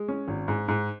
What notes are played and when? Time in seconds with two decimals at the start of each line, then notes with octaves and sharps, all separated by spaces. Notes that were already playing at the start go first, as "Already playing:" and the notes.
Already playing: G#3
0.08 C#4
0.28 G#1
0.48 G#2
0.68 G#2